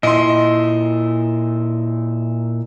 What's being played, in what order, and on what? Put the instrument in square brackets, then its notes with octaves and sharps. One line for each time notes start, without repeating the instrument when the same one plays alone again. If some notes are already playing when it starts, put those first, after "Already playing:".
[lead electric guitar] A#2 E4 [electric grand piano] D#5 C6